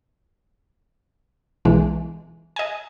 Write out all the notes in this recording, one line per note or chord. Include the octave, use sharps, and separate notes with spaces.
B1 E3 G#3
D#5 G#5